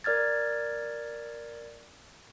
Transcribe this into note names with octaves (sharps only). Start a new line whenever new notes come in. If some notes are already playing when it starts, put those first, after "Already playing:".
A#4 D5 F6 G#6 A6